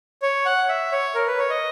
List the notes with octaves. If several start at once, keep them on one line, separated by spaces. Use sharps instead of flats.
C#5
F#5
E5
C#5
A#4
B4
C#5
D#5